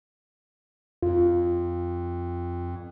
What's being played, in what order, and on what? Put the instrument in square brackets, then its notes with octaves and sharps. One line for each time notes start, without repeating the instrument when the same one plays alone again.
[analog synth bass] F2 [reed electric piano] F4